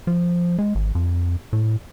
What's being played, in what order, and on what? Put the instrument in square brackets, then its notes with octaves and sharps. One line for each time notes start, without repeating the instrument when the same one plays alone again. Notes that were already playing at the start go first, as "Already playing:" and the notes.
[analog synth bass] F3
G#3
G#1
F2
A2